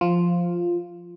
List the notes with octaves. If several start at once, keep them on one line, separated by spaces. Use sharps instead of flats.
F3 F4